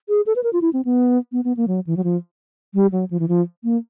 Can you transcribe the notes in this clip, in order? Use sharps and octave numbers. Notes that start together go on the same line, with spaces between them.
G#4
A4
B4
A#4
F4
E4
C4
B3
B3
B3
A#3
F#3
E3
F#3
F3
G3
F#3
F3
E3
F3
A#3